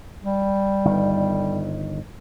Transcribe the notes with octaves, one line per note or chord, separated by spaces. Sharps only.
G3
G1 D#3